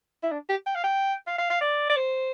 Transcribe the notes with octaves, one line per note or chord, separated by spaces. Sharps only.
E4
D4
G4
G5
F5
G5
F5
F5
F5
D5
D5
C5